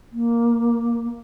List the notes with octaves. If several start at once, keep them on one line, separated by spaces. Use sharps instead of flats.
A#3